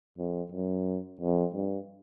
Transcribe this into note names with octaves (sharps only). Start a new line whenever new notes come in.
F2
F#2
F2
G2